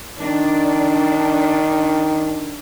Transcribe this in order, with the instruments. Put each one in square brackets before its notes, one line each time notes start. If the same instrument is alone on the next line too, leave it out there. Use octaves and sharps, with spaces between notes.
[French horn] D#3 [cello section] D4